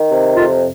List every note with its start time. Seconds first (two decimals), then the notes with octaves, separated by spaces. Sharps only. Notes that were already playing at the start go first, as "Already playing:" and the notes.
Already playing: D#3
0.11 C3
0.36 F2 F4